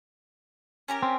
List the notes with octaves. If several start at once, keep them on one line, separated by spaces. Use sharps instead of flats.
C#4 G4 A#4
C4